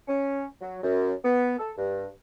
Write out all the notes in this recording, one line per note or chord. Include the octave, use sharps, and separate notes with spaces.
C#4
F#3
F#2
B3
A4
G2